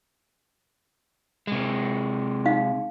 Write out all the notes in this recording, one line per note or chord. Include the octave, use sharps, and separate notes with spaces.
C3 G#3
D#4 F5